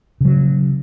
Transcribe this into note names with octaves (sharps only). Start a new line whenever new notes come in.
C#3 F#3